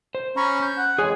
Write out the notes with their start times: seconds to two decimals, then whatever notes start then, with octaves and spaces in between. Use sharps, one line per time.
0.15 C5
0.37 C#4 A#5 B5 C#6
0.62 G6
0.78 F#5
0.98 F2 E3 G#3 G#4 C#5 G#5